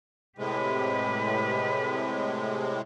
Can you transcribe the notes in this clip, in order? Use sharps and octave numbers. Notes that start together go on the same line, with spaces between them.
A2 C3 G#3 G4 B4